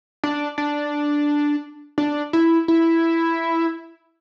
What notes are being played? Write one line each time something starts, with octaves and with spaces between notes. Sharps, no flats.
D4
D4
D4
E4
E4